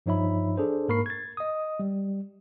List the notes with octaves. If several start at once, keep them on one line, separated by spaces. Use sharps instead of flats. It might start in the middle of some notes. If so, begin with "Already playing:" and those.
G2 F3 D#4 C#5 E5 B5
D4 G#4 A4 C5
G#2 A#3 A#4 B5 C#6 C7
G#6 A6
D#5 D#6
G3